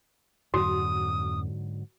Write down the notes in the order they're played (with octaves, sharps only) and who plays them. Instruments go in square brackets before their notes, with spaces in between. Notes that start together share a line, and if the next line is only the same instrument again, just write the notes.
[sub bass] F2 [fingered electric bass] G#2 D3 F#3 [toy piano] F#4 [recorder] D#6